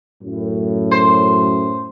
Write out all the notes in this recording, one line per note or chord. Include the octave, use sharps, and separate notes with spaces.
F#2 A2
C5